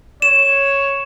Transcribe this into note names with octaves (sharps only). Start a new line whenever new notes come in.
C#5 E7